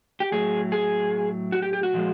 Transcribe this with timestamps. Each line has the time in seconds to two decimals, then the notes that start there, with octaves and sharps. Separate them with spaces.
0.20 G4
0.32 A2 F#3 G#4
0.72 G#4
1.52 F#4
1.62 G4
1.73 G4
1.83 F#4
1.93 A#2 F3 G#3